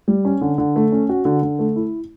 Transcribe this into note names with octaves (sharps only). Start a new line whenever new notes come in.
G3
C#4
D3
D3
A3
C#4
F#4
D3
D3
A3
E4